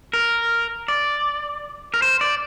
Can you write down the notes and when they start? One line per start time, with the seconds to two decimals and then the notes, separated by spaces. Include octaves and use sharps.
0.13 A#4
0.88 D5
1.94 A#4
2.02 C5
2.21 D5